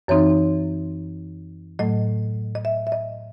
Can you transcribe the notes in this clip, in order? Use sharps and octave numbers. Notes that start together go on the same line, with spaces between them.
F#2 E3 C4 D#4 C#5
A2 F#3 A3 D#5
D#5
E5
E5
D#5